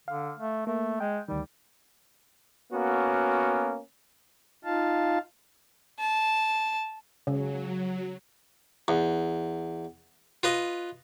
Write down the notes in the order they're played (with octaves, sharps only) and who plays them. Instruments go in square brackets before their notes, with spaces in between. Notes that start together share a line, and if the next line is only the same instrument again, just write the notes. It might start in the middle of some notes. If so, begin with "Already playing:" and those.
[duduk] D3 [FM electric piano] F5
[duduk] A3
[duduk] A3 [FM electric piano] A#3
[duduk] G#3 [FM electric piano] G5
[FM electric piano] D2 D#3 [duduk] G3
[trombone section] A#3 B3 C#4 F#4
[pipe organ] D#4 F4 F5 A5
[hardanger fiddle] A5
[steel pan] C#3 [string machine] F#3
[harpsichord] E2
F4 B4 D#5